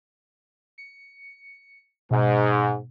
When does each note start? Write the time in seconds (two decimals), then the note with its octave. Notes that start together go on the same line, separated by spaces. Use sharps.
0.78 C#7
2.11 G#2 B2